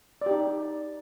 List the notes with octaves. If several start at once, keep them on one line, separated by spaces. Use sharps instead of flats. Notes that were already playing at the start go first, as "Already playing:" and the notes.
D#4 G4 D5